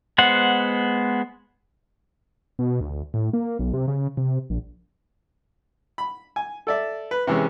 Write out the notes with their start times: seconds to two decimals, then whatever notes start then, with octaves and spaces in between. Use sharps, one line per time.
0.18 G#3 B3 C5 F#5
2.59 B2
2.81 D2
3.14 A2
3.33 A#3
3.59 B1
3.74 C3
3.88 C#3
4.17 C3
4.50 A#1
5.98 B5
6.36 G#5
6.67 A4 D5 E5
7.11 B4
7.27 C3 E3 G#3 C#4